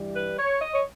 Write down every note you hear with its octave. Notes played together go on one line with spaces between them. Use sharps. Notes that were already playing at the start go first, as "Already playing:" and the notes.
Already playing: G2 E3 G3
B4
C#5
D#5
C#5